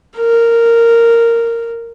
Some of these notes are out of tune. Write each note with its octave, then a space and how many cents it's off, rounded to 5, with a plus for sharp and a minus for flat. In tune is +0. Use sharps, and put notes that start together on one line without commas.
A#4 -10